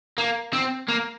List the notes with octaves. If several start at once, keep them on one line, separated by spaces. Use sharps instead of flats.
A#3
C4
A#3